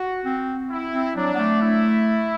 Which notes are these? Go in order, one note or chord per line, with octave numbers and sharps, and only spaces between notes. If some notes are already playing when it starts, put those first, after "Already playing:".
Already playing: F#4
C4
E4
C4
F#3 D4
B3
A3
E4